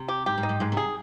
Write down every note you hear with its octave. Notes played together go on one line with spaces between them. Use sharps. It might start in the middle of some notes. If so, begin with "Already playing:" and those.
Already playing: C3
G4
G#2 G4
G#2
D#4
G#2
G#2 G#3
C3
G#4